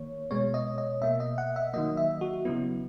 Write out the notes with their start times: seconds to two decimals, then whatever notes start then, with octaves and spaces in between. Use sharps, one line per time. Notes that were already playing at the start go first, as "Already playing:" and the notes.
Already playing: D#3 A#3 C#5
0.31 B2 G#3 B3 C#5
0.54 D#5
0.78 D#5
1.01 B2 A#3 E5
1.20 D#5
1.38 F#5
1.56 E5
1.74 D#3 F#3 A#3 D#5
1.97 E5
2.21 F#4
2.45 C#3 F#3 B3 E4